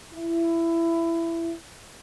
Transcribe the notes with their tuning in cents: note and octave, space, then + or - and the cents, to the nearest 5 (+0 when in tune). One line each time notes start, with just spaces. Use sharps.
E4 +20